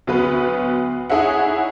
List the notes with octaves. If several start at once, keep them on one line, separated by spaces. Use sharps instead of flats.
D2 F#3 B3 B4 B5
D#4 E4 G#4 C#5 E5 F#5